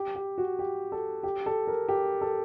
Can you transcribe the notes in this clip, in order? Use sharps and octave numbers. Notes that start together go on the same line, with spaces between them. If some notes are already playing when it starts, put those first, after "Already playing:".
Already playing: G4
G4
F#4
G4
A4
G4
A4
A#4
G4
A4